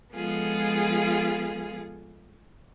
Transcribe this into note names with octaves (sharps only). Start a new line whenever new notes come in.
F3 G#3 B3 F4 G#4 A4